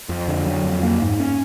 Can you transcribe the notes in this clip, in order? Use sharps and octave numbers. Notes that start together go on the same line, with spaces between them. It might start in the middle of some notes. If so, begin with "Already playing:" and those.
F2
D3
F#3
F2
A#3
G#2
C#4